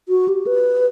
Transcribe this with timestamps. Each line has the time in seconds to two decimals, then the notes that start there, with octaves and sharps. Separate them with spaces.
0.09 F#4
0.28 G4
0.47 B4